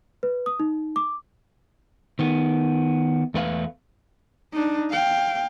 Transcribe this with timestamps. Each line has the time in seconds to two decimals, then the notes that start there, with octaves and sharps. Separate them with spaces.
0.23 B4
0.46 D#6
0.60 D#4
0.96 D6
2.19 D#3 B3
3.34 E2 A3 B4 F5
4.53 D4 D#4
4.90 F5 G5